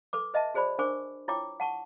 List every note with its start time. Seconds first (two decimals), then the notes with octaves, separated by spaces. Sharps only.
0.13 A4 B4 D6
0.34 B4 D#5 E5 A5
0.54 F#4 G#4 C5 D5 B5
0.79 D4 A#4 C5 G#5 C#6 D6
1.28 E4 F4 C#5 G5 D6
1.60 F#5 A5 C#6